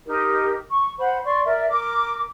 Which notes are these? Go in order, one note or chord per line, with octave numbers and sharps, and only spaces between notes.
D#4 G4 A#4
C#6
C5 F#5 B5
D5 C6 C#6
A#4 D5 E5
A#4 D6